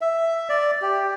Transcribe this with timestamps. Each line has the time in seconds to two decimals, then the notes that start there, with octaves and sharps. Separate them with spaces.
0.01 E5
0.49 D5
0.82 G4